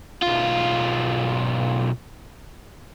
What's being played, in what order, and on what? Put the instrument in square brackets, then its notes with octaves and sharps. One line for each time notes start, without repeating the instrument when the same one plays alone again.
[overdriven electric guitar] B1 F4